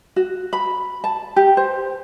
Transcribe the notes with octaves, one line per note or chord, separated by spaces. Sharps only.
F#4
B5
A5
G4
C5